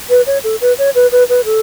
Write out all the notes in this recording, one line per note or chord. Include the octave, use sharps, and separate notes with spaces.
B4
C#5
A4
B4
C#5
B4
B4
B4
A4